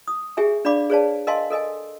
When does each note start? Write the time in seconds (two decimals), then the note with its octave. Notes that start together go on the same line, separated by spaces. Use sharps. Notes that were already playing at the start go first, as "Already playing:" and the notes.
0.08 D#6
0.37 G4 G#4 E5 G#5
0.65 D4 D5 F5 B5 D6
0.90 G#4 B4 C#5 D5 F5 A5
1.27 A#4 D#5 F5 G#5 A5 C6
1.50 A4 A#4 D#5 G#5